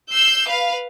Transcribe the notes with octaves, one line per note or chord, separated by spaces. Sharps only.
E6 G6 C7
B4 F5